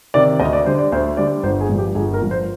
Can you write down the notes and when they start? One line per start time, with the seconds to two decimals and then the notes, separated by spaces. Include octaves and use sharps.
0.14 C3 D#3 D5
0.40 D2 D#5
0.53 D5
0.65 D3 G3 C5
0.79 D5
0.92 D2 C5
1.17 D3 G3 D5
1.43 G1 C5
1.61 G#4
1.69 G2
1.75 F3 G4
1.95 G1 G#4
2.14 A#4
2.22 G2 F3
2.31 C5